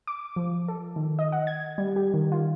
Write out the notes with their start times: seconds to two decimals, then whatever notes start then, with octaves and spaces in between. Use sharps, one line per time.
0.07 D6
0.36 F3
0.68 A4
0.96 D#3
1.19 D#5
1.32 F#5
1.47 G#6
1.78 G3
1.96 G4
2.14 D#3
2.32 F4